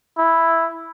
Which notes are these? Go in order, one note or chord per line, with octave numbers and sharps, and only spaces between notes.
E4